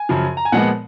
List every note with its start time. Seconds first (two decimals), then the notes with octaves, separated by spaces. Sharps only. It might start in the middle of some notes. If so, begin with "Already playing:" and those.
Already playing: G#5
0.09 F#2 C#3 F3
0.37 A#5
0.45 G#5
0.52 A#2 F3 G#3 B3 F#5